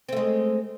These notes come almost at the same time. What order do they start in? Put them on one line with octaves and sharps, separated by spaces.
C4 A3 G#3